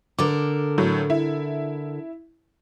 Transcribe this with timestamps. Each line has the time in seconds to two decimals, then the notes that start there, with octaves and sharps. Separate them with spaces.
0.19 D3 A4 A#4 D6
0.78 A2 F#3
1.10 E4